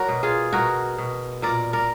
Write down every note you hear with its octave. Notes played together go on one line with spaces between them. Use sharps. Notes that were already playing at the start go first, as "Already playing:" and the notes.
Already playing: F#3 F#4 A#4 D5
B2
F4 G#4
B2 F#4 A#4
B2
A#2 A#4 D5
A#4 D5